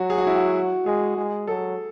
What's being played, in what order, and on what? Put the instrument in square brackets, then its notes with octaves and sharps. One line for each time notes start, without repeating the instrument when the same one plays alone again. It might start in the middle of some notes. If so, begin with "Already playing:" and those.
Already playing: [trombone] F#3 [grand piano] F#4
[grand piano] G#4
F#4
E4
F#4
[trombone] G#3 [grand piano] G#4
[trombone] G#3
[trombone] F#3 [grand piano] A4